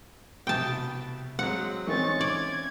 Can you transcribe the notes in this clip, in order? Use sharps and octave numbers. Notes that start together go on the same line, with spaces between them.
C2 B2 G5 A5 D#6
F#3 G#3 C4 F#5
E3 C4 C#4 D#4 C#6 A6
D5 G#6